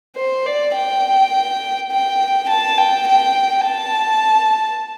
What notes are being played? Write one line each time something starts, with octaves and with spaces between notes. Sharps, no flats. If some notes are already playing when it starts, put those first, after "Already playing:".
C5
D5
G5
G5
A5
G5
G5
A5